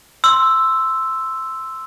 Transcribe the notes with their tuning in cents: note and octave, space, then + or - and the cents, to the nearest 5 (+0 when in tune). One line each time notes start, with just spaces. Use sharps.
C6 +0 E6 +0